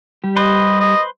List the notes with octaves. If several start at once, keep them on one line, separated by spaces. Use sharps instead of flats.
G3 G4
B4 C5 D#5
D#5